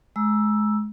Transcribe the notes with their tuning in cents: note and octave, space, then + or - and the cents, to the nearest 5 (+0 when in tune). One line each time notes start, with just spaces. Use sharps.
G#3 +30 A#5 +30 E6 +0